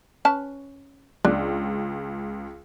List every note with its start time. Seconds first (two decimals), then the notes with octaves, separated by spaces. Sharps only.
0.25 C#4 B4 A5
1.25 C#2 D4